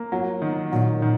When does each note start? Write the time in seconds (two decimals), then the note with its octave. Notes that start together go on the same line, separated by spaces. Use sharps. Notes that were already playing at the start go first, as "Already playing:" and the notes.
Already playing: A#3
0.12 F#3
0.42 D#3
0.72 A#2 F#3
1.02 D#3